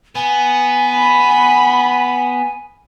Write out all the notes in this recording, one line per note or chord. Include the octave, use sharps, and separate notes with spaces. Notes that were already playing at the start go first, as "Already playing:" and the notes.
B3 G#5
B5